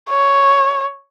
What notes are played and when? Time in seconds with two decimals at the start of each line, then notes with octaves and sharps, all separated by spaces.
0.10 C#5